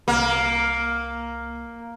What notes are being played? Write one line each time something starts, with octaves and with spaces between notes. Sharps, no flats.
C2 A#3